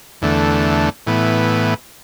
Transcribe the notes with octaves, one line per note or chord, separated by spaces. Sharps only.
E2 D3 A3
A2 E3 B3